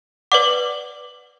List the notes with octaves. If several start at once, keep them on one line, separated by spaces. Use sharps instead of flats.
B4 D5 F#5 D6